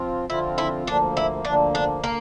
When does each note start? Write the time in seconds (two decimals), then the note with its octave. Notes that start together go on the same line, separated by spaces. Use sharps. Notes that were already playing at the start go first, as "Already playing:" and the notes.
Already playing: F3 C4 F4
0.28 D3 F3 C4 E4 F4
0.58 E4
0.86 D2 D3 F3 A#3 D4
1.17 E4
1.45 D2 D3 F3 A#3 D4
1.75 D4
2.04 D3 A#3